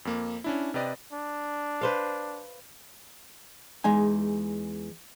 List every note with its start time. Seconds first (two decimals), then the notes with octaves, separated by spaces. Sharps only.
0.05 F2 A#3
0.44 C#4 D4 E4
0.74 C3 G4 B4 D5 D#5
1.13 D4
1.81 B4 C5 F5
3.84 E2 G#3 D#4 G#5